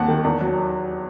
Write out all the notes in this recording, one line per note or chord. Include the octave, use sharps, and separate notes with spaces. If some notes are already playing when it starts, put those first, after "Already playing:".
Already playing: D#2 G3 C4 F#5 A5
D#3
E2
F#3